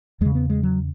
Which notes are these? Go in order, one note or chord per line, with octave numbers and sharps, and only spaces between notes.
E2 C#3 G#3
B3
G#3
F#3